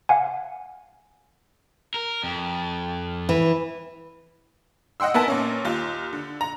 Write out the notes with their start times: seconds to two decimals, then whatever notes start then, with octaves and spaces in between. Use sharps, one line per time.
0.09 F5 F#5 G#5
1.94 A#4
2.24 F2
3.29 E3
5.00 D#5 F#5 G5 C6 E6
5.14 B3 E4 A#4 E5 G#5 A5
5.28 A#2 A#3 C#4
5.65 D#2 F4
6.13 D3
6.41 A#5